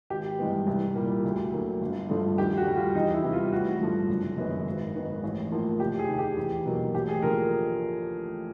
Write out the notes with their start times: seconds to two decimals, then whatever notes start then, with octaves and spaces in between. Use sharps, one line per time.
0.10 G#1 G4
0.39 G2 E3 G#3 B3
0.67 C2
0.95 A#2 G3 A#3
1.25 D2
1.52 D3 F#3 A#3
1.81 G1
2.09 G2 D3 F3 A3
2.38 D#2 G4
2.57 F#4
2.67 D3 G3
2.76 F4
2.95 E2 D#4
3.14 E4
3.23 C3 E3 G3 B3
3.33 F4
3.52 A1 F#4
3.81 G2 D3 F3 A3
4.09 F#1
4.38 F#2 D#3 G#3 B3
4.66 G#1
4.95 G#2 D#3 G#3 B3
5.23 A1
5.51 A2 F3 A#3
5.80 F1 G4
5.99 G#4
6.08 D#2 D#3
6.19 G4
6.37 E2
6.66 B2 F#3 A#3
6.94 A1 G4
7.08 G#4
7.23 D3 F3 A#3 A#4